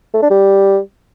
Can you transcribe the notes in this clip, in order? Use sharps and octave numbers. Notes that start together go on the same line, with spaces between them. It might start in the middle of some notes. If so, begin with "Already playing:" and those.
A3
D4
G3